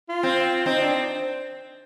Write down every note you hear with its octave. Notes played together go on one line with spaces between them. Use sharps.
F4
C4
C4 D#4
D4